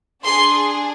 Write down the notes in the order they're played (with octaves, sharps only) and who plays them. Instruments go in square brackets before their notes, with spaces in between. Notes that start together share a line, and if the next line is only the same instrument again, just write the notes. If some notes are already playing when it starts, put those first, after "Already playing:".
[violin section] D4 G#4 C6